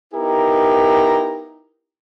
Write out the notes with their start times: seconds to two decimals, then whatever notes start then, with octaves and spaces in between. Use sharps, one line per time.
0.14 B3 D#4 E4 G4 A#4